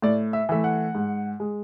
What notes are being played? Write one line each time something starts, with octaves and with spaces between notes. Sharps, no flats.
A2 D5
E5
E3 A3 E5
F#5
G#2
G#3